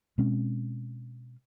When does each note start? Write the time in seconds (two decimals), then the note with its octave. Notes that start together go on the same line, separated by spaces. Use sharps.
0.18 B2 G#3 C4 C#4